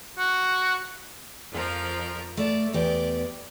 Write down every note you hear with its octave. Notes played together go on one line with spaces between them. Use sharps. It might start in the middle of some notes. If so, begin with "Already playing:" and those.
F#4
F2 F3 A#4
A3 D5
E2 G4 D5